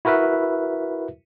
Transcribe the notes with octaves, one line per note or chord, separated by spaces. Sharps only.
E4 F#4 A#4 B4 E5